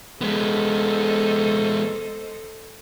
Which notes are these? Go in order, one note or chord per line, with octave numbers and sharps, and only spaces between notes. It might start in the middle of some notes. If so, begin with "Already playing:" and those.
G#3 B3 A4 C5 D#5